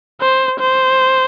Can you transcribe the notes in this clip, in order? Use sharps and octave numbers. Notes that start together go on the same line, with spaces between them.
C5
C5